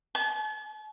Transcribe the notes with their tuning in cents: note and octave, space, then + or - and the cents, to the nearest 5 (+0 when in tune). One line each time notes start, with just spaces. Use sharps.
A5 -45